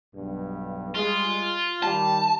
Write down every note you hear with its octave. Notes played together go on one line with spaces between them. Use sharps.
B1 G2
G3 G#3 F4
D#3 G3 G4 A5